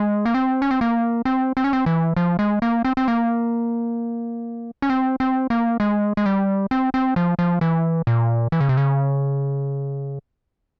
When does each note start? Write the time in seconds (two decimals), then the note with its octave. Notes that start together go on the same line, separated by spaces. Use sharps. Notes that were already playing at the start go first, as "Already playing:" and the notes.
Already playing: G#3
0.25 A#3
0.34 C4
0.62 C#4
0.71 C4
0.81 A#3
1.25 C4
1.57 C4
1.64 C#4
1.73 C4
1.86 E3
2.16 F3
2.39 G#3
2.62 A#3
2.85 C4
2.97 C4
3.08 A#3
4.82 C#4
4.90 C4
5.20 C4
5.50 A#3
5.80 G#3
6.17 G#3
6.26 G3
6.71 C4
6.94 C4
7.16 F3
7.39 F3
7.61 E3
8.07 A#2
8.52 E3
8.61 C#3
8.69 C3
8.77 C#3